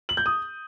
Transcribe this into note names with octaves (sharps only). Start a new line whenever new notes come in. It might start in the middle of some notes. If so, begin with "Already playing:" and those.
F#7
G6
D#6